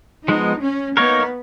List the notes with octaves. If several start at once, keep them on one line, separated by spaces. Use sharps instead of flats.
F3 G#3 B3 D#4
C#4
A#3 B3 D#4 A#4 C#5